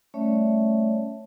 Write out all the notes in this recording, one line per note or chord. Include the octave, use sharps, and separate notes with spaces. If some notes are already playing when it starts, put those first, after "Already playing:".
G3 A3 C#4 C#5 D5 E5